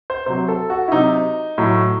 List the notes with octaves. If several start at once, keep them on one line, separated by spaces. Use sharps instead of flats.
C5
C3 F#3 C5
A4
F#4
E4
C3 F#3 D#4
A2 F#3